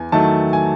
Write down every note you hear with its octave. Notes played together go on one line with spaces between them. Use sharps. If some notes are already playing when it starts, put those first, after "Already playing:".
Already playing: E2 G#5
D#3 F#3 A3 A5
G#5